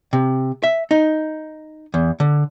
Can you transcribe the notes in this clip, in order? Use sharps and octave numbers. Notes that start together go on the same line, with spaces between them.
C3
E5
D#4
E2
D3